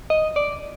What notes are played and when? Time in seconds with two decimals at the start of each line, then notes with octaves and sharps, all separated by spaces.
0.10 D#5
0.36 D5